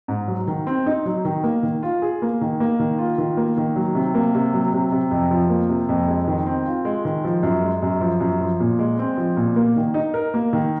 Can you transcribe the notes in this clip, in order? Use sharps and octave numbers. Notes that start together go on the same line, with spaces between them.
G#2
F#3
D#3
C4
D#4
F#3
D#3
A#3
D#3
F4
G#4
A#3
D#3
A#3
D#3
F4
D#3
A#3
D#3
F#3
C3
A#3
C3
F#3
C3
C3
F2
F3
A#3
C3
F2
G#3
D#3
C4
F4
G#3
D#3
F3
F#2
G#3
F#2
F3
F#2
F3
A#2
G#3
C4
F3
A#2
A#3
D#3
D#4
A#4
A#3
D#3